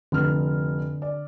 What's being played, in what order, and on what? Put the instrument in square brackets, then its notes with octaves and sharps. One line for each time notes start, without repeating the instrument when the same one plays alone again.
[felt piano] F1 F6 [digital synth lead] D3
[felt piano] D5